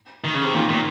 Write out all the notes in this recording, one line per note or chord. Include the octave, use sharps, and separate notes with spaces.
D#3
C#3
C3
A#2 D#3
A#2